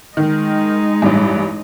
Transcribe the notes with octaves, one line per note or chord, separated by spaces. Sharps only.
D#3 G#3 D#4
A1 G2